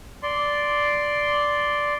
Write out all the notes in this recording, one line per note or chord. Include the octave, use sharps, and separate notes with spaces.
D5 C6